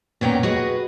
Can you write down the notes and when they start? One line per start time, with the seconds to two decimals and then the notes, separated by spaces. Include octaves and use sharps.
0.21 A#2 B3 C#4 G5 A#5
0.43 F#4 G#4 B4 D#5